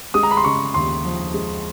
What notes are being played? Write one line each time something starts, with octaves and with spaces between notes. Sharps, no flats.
G#3 D#6
A#5
B5
C6
C#3 C#6
D#2 C6
F3
G#3